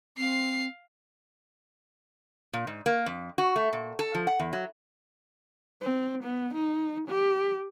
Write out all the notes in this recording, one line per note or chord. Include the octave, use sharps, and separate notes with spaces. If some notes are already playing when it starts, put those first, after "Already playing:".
C4 F5 C7
A#2
G#2
A#3
F2
F#4
A3
A#2
A4
F3
F#5
E2
F#3
C4
B3
D#4
G4